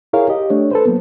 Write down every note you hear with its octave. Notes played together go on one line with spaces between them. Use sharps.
E4 G#4 A#4 C#5 F5
G4 D#5
A3 D4 C#5
A4 B4 C5
F#3 A#3 B3